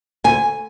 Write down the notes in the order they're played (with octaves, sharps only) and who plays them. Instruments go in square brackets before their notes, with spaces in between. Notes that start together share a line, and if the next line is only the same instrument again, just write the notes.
[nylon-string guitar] D2 G#5